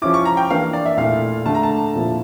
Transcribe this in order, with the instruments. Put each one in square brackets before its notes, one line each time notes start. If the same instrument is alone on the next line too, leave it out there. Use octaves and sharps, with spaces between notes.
[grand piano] F3 C#4 E4 [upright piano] D6
[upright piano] C#6
A#5
G5
[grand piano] E3 A#3 D4 [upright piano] F5
[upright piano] D5
E5
[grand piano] A#2 A3 E4 [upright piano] F5
[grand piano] D3 A3 D4 [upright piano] A5
[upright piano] A#5
A5
[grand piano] A#2 F3 A#3 E4